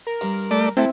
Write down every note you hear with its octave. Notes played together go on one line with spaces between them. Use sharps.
A#4
G2
A3 D5
A3 C4 E4 E5